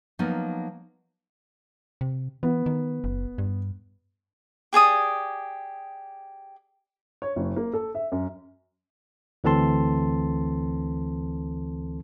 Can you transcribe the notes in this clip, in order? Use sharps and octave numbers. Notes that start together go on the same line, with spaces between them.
F3 F#3 A#3 B3 D#4
C3
E3 B3
D#3
F#1
G2
G4 G#4 D5 D#6
C#5
F#1
A#3
A4
E5
F#2
D2 E3 C4 A4 A5 C6